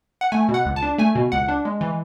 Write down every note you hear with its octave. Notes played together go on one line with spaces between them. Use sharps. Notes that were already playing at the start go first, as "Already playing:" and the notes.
F#5
A3 G#5
B2
F#5
C#2
A5
D4
A3 G#5
B2
C#2 F#5
D4
G#3
E3